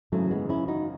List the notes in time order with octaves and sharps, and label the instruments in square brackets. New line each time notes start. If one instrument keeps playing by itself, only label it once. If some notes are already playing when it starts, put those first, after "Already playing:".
[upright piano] G#1 F#2 C#3 E3 [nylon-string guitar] F#3 A3
[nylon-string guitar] G#3 B3
C#4 E4
D#4 F#4